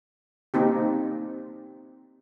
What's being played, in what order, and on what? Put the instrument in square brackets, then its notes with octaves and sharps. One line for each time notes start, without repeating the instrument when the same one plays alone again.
[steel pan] A#3 C4 D#4 G4